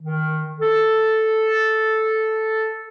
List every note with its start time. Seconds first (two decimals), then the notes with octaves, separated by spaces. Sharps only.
0.01 D#3
0.60 A4